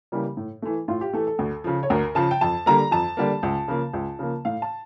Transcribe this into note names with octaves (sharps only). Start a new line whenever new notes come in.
C#3 E3 G3 A#3
A2
E3 A3
A2 F4
G4
E3 A3 A4
A4
D2
C#3 F3
C#5
D2 A#4
C#3 F3 A5
G5
F2 A5
D3 G3 A#3 A#5
F2 A5
D3 G3 A#3
C#2
C#3 F3 A#3
C#2
C#3 F3 A#3
A2 F5
A5